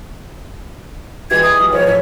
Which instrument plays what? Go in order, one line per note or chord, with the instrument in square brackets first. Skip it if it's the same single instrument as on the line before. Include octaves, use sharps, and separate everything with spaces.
[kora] E3 G3 G#3 [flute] G#6
[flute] D#6
[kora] G3 G#3 F4
[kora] E3 F3 A3 [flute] C#5
[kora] A2 A4 E5 [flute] C#5